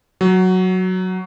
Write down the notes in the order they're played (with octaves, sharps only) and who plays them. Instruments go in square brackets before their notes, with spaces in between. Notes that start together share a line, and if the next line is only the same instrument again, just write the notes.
[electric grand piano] F#3